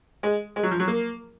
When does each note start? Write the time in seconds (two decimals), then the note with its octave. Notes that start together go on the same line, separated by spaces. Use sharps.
0.23 G#3
0.56 G#3
0.63 F#3
0.71 F3
0.80 F#3
0.88 A#3